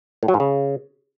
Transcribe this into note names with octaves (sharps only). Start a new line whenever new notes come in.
A2
F#3
G#2
C#3